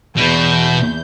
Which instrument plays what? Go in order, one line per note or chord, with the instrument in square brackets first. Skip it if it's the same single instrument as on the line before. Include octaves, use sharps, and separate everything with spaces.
[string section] E2 G6 [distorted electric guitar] B2